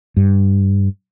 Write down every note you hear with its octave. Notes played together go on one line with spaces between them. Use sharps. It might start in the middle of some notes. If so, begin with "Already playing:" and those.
G2